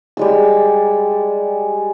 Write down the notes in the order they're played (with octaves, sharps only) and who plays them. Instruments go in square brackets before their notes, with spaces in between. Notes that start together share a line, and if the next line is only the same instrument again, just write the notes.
[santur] G3 G#3 E6